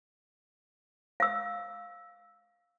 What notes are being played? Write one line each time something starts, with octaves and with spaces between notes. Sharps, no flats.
F5 E6